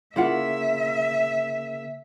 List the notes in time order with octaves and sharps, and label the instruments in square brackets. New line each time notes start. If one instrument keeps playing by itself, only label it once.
[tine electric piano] C#3 A#3 [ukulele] E4 F4 F#5 [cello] E5